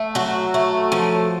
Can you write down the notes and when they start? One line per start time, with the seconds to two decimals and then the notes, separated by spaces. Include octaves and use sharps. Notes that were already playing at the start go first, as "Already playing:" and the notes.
Already playing: A3
0.15 F#3 F#4
0.54 A3
0.92 F3